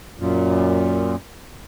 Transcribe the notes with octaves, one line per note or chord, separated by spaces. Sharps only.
F#2 A#2